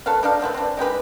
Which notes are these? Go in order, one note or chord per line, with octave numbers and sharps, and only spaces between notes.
A4 B4 C#5 F5
D4 D#4 F5
A3 C4 G4 B4
C4 D4
G#3 D#4 G4 B4